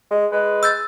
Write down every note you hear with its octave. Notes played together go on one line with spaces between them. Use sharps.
G#3
G#3 B4
E6 G6 A6